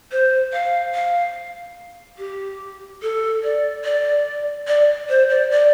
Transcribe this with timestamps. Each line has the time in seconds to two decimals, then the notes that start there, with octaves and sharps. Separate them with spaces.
0.12 C5
0.52 F5
0.94 F5
2.18 G4
3.02 A4
3.43 D5
3.84 D5
4.67 D5
5.09 C5
5.29 D5
5.51 D5